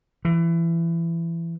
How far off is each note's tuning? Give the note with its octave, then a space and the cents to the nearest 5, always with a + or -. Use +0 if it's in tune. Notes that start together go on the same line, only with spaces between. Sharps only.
E3 +20